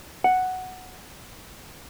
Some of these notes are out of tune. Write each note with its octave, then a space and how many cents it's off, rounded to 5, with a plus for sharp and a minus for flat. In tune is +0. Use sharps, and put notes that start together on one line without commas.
F#5 +0